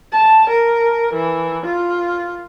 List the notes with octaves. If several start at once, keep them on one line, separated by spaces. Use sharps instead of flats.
A5
A#4
E3
F4